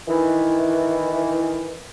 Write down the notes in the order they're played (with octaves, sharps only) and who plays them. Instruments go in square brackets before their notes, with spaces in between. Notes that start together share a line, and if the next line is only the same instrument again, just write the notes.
[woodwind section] D#3 E3